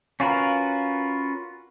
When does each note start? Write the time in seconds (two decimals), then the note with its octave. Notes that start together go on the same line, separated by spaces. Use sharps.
0.20 C#4 F4 F#4 A#4 B4